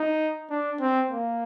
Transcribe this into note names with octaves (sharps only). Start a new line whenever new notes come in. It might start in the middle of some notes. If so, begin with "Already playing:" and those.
Already playing: D#4
D4
C4
A#3